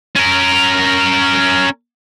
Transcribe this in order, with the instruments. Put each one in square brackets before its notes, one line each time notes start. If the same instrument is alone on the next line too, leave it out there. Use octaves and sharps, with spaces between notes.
[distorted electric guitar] C#4 A#4